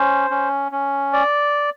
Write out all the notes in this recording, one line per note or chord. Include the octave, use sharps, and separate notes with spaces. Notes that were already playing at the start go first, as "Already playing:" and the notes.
Already playing: C#4 C5
C#4
C#4
D5